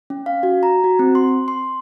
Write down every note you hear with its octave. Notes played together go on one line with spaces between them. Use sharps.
C#4
F5
F#4
A#5
F#4
C4
C6
C6